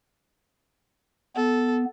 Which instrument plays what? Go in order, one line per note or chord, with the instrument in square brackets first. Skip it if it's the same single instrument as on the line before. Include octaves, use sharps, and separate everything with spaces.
[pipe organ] B3 [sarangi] A4